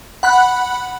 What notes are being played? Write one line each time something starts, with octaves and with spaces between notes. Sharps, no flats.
F#5 B5 F#6